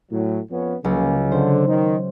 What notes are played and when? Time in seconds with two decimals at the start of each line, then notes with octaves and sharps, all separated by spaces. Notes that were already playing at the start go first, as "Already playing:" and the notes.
0.12 A2 F#3
0.51 F2 B3 C#4
0.84 C#2 C#3 F#3 A#3
1.32 D3 C5
1.67 D#3